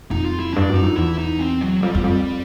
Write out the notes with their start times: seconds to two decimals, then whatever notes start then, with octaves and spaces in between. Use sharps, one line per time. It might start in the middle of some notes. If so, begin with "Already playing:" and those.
0.11 F2 D#4
0.25 F4
0.40 E4
0.54 G2 D4
0.69 F#2
0.75 D#4
0.83 F2
0.97 E2 E4
1.18 D#4
1.39 C4
1.61 F#3
1.82 F2 G3
1.94 E2
2.03 F2 G3